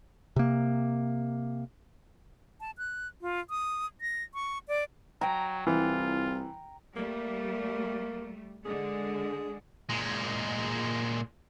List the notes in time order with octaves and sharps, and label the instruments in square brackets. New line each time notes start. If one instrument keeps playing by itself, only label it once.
[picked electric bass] C3 A#3
[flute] A5
F#6
F4
D#6
A#6
C#6
D5
[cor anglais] F#3 [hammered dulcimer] G5 A#5
[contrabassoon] C2 [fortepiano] E3 [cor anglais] F4
[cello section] G3 A3 [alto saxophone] A#3
[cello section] D3 G#3 [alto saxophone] G#4
[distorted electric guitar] A#2 G#3